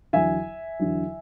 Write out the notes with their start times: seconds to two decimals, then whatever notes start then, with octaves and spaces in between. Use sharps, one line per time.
0.13 E2 D3 F#3 E5 G#5
0.79 E2 D3 F#3